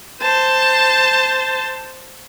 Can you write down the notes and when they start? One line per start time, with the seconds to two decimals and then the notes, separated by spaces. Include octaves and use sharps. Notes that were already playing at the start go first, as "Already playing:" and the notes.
0.21 C5 A5